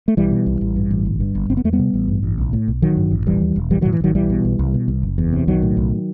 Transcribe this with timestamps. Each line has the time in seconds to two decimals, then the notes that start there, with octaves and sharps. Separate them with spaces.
0.08 A3
0.17 B1 E3 G3
0.31 B2
0.46 B1
0.61 A1
0.76 G2
0.91 A1
1.05 G1
1.20 G2
1.35 G1
1.50 F#1 C4
1.57 B3
1.64 E2 A3
1.73 G3 B3
1.79 C3
1.94 A1
2.09 G2
2.23 A1
2.38 B1
2.53 A2
2.68 B1
2.82 A1 D#3 F#3
2.97 G2
3.11 A1
3.26 E1 E3 G3
3.41 D#2
3.56 E1
3.71 A1 E3 G3
3.81 D#3 F#3
3.86 A2
3.93 E3
4.00 A1 D#3 F#3
4.15 B1 E3 G3
4.30 B2
4.45 B1
4.59 C2
4.74 B2
4.88 C2
5.03 F#1
5.18 E2
5.33 C3
5.47 B1 D#3 F#3
5.62 A2
5.77 B1